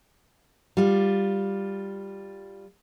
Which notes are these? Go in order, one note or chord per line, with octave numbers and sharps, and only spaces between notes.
G3 F4